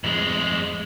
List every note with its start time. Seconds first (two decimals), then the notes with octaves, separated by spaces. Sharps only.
0.04 F2 G#3